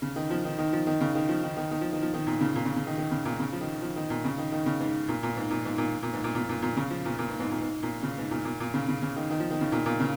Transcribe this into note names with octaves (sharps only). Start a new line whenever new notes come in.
C#3
D#3
F3
D#3
D#3
F3
D#3
C#3
D#3
F3
D#3
D#3
D#3
F3
D#3
F3
D#3
A#2
C#3
A#2
C#3
C#3
D#3
D#3
C#3
A#2
C#3
F3
D#3
F3
D#3
A#2
C#3
D#3
D#3
C#3
G#2
A#2
A#2
G#2
A#2
G#2
A#2
A#2
G#2
A#2
A#2
A#2
A#2
C#3
F3
A#2
A#2
G#2
G#2
A#2
G#2
A#2
C#3
G#2
A#2
A#2
A#2
C#3
C#3
C#3
D#3
D#3
F3
D#3
C#3
A#2
A#2
C#3